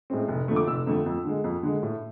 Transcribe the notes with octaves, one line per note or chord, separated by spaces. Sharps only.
A2 G#3 C4
F1
F2 D3 A3
D6
F1 E6
F2 D3 A3
F2
D3 G#3
F2
D3 G#3
A2